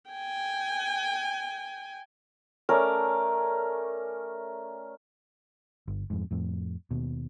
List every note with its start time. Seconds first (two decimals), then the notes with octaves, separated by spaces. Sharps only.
0.10 G5 G#5
2.69 A3 C#4 A#4 D5
5.87 G1
6.10 F2 G#2
6.31 F2 A2
6.91 D#2 B2